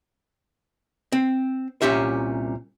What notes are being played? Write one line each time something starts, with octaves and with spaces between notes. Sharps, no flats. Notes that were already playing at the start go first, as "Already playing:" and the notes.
C4
C2 A#2 C#4 G4 E5